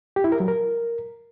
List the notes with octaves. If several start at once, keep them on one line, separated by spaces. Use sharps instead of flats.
G4
E4
A#4
F#3
A#4